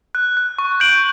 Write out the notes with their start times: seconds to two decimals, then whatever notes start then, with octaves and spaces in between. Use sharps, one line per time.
0.15 F#6
0.37 F#6
0.59 C#6
0.80 G6 D7 F#7